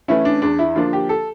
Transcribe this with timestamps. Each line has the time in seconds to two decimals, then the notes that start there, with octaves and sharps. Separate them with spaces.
0.08 E3 A3 C#4 E4
0.25 D4
0.42 E2 D4
0.59 E4
0.76 D3 F3 A#3 D4 F4
0.93 G4
1.09 A4